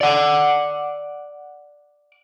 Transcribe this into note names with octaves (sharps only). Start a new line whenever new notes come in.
D5 F#5